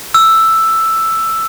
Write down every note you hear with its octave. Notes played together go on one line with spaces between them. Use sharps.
E6